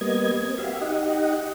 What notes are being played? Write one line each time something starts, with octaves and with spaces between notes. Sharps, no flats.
G3 A#3 B3 D#5 G#6
C4
F#4 G4 E5 F5
D#4 G4 D#5 F#5